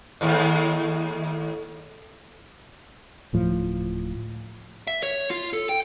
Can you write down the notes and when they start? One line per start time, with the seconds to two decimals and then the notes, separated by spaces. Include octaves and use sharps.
0.21 D#2 A2
3.33 D1 A2 F3
4.87 E5
5.03 C#5
5.31 F4
5.53 A4
5.69 G5